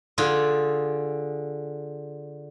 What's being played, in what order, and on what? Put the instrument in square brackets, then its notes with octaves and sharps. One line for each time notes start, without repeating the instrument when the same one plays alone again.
[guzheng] D3 F4 G#4